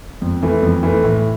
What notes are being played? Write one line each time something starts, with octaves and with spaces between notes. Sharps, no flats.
F2
E3 A3
F2
E3 A3
A2